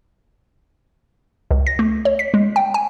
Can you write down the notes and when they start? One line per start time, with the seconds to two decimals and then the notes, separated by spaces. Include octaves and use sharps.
1.51 C#2
1.67 A#6
1.79 A3
2.05 C#5
2.19 B6
2.34 G#3
2.56 G5
2.74 G#5